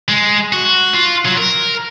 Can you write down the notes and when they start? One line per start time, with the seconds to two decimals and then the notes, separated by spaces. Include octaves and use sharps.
0.09 G#3
0.53 F#4
0.94 F4
1.26 F#3
1.37 A#4